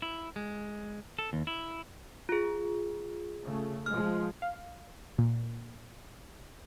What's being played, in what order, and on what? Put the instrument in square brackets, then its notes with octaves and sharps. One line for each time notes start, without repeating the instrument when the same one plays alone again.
[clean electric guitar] E4
G#3
A4
D#2
E4
[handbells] F4 G#4
[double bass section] C#3 A3
[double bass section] F3 G#3 [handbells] F6
[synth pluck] F5
A#2